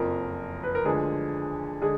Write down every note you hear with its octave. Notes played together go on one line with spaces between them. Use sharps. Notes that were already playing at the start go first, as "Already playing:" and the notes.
Already playing: F#1 F2 F3 A#4
B4
A#4
D2 D3 F3 G#3 G#4
D3 G#3 G#4